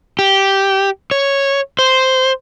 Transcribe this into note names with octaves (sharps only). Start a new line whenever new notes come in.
G4
C#5
C5